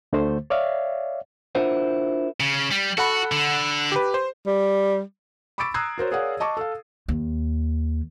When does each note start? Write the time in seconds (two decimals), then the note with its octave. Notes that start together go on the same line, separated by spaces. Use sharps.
0.13 D2 D3 A3 C5
0.50 C#5 D5 E5 F5
1.55 D4 E4 F4 A#4 C5 F#5
2.40 C#3
2.71 G3
2.98 F#4 A4 F#5 B5
3.32 D3
3.92 G4 B4
4.14 C5
4.47 G3
5.58 B5 C#6 D6 E6 A6 D7
5.74 A#5 D#6 E6 F#6 G#6 C7
5.98 F#4 A#4 C5 C#5
6.12 G#4 A#4 C#5 D5 F5 F#5
6.40 D#5 A5 C#6 D6
6.57 A4 F5
7.08 D#2